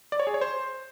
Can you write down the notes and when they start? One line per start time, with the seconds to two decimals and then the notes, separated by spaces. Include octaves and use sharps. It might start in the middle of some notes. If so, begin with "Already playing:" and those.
0.12 D5
0.20 C#5
0.27 G#4
0.34 C#5
0.41 C5